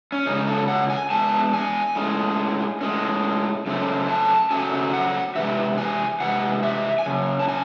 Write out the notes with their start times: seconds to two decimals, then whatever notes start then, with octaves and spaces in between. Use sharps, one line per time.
0.12 C#4
0.25 E2 C#3 G#3 D#4
0.47 A4
0.68 F#5
0.90 G#5
1.10 E2 C#3 G#3 A5
1.53 G#5
1.95 A2 G#3 C#4
2.81 A2 G#3 C#4
3.66 F#2 C#3 A3 C4
4.08 A5
4.51 F#2 C#3 F#3 A3 C4 G#5
4.93 F#5
5.35 C3 E3 G#3 E5
5.78 G#5
6.20 C3 E3 G#3 F#5
6.63 E5
6.99 G#5
7.06 F#2 C#3
7.39 A5
7.48 G#5